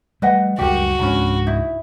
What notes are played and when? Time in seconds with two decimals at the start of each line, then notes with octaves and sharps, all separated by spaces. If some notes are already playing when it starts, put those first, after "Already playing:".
0.22 G3 A3 B4 D#5 F#5
0.59 C#2 F#2 G3 F#4 G4 A#4
0.99 C#2 G#2 C#4 D4 B5
1.46 D#4 E4